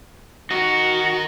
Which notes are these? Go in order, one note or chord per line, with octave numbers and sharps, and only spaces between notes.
F#4 A#4 D#5